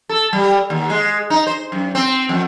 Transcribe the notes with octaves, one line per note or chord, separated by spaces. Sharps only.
A4
G3
D#2
G#3
D#4
C5
F#2
C4
F2